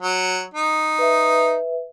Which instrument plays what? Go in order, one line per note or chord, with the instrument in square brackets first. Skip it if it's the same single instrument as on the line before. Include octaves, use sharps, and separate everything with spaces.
[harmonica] F#3
D#4
[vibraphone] B4 E5